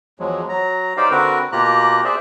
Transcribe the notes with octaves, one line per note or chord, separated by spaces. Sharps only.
E2 F3 F#3 G#3
F#3 A#5
D#4 G4 C5 D5 F5 G5
D3 C4 F#4 A#4 B4
B2 A#3 F4 G4 A#5 F#6
G#4 C5 D5 E5